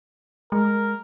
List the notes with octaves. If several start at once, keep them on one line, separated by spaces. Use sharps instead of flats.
G#3 A#4